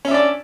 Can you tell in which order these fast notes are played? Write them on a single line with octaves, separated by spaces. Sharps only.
C#4 E5 D4 D5